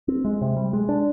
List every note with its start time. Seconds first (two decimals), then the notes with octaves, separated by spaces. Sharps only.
0.08 C4
0.25 G#3
0.41 C3
0.57 G3
0.73 G#3
0.89 D4